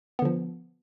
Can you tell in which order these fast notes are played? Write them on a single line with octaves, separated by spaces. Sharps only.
B3 D3 F3